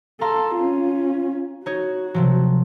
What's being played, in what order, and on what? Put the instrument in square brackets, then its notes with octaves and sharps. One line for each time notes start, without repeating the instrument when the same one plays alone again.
[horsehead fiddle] A4 [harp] F5 A#5 C6
[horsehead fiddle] C#4 F4
[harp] D#4 C#5 [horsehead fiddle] F#4
[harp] C3 F3 F#3